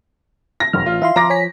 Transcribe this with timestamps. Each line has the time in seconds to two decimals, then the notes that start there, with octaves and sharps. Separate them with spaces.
0.60 A#6
0.73 E1 F#2 D#3 F6
0.86 A1 F4
1.02 E3 E5 F5 C6
1.16 F3 A#5 D6 A#6
1.30 C#5 G#5 B6